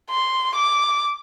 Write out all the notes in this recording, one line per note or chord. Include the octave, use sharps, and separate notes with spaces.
C6
D6